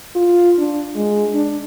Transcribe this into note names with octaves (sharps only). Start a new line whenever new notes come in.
F4
D4
G#3
D4